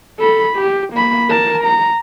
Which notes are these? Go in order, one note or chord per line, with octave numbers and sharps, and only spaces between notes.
A4 B5
G4
A#3 B5
A#4 A5
A#5